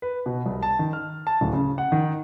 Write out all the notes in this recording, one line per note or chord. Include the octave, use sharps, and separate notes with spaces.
B4
B2
C2
A5
D#3
F6
A5
D1
C#3
F#5
D#3